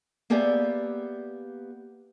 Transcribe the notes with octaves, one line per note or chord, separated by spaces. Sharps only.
A#3 B3 G4 G#4 D5 E5